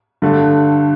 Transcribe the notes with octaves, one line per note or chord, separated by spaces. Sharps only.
G2 D3 A3